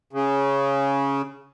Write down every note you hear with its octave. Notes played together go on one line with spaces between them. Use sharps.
C#3